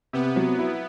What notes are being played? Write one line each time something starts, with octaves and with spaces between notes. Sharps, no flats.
C3 B3
F#3
E4